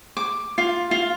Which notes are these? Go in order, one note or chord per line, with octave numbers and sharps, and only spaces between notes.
D6
F4
F4